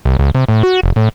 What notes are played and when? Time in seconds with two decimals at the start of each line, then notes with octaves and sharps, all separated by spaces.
0.05 C2
0.19 C#2
0.35 C3
0.48 A2
0.63 F#4
0.83 F1
0.96 A2